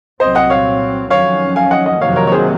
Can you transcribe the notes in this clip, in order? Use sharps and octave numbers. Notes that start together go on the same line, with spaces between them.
C2 A#2 F#3 C4 C5 D#5
D#5 F#5
C#5 F5
F2 D#3 F#3 C#4 C#5 F5
F5 G#5
D#5 F#5
D#5 F#5
F2 C3 D#3 F#3 A#3 C#5 F5
A#4 C#5
C#5
G#4 C5